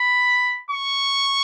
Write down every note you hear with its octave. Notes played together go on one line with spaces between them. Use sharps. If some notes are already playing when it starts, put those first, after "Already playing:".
Already playing: B5
C#6